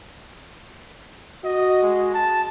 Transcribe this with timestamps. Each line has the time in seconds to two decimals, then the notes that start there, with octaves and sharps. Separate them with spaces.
1.44 F#4 D#5
1.82 G#3
2.14 A5